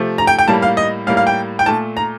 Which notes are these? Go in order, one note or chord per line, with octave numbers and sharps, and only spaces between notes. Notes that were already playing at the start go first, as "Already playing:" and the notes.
Already playing: C3 F3 A3
A#5
G5
G5
A2 G3 A#3 A5
F5
D#5
A2 G3 A#3 F5
F5
G5
G5
A#2 A3 A5
A#5